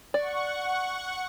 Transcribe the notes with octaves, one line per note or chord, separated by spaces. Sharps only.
D5 F#5 C#6